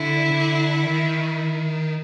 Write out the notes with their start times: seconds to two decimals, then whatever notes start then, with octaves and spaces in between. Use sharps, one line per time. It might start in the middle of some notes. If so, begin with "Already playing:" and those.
Already playing: D3 E4
0.31 D3
0.85 D#3